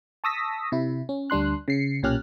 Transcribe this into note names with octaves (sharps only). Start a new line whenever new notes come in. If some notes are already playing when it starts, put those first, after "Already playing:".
A5 C#6 D#6 E6 A#6 B6
C3 E4
C#4
D2 G3 D4 C6 F#6
C#3 C7 C#7
B1 A#2 C#4 G4 F6 F#6